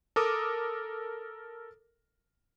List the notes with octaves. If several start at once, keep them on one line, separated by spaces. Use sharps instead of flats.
A4 A#4 D6 D#6